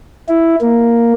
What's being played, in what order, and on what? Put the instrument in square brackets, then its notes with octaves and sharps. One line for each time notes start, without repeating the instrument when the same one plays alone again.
[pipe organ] E4
A#3